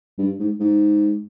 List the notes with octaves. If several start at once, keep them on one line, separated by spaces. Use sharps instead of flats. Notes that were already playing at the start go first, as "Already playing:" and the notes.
G2
G#2
G#2